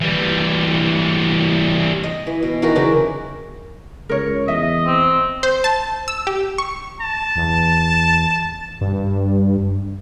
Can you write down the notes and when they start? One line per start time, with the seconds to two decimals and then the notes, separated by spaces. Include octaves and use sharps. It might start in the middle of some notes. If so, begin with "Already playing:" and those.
0.01 E3 G3
2.03 D#5
2.27 E3
2.42 B2
2.62 D#3 E3 F#4 A#4
2.75 C#3 E3 F#3 D4
4.09 C#2 A#4 C#5
4.48 E2 D#5 E5
4.86 C4
5.43 C5
5.64 A5
6.08 E6
6.27 G4
6.58 C#6
7.01 A5
7.36 E2
8.81 G2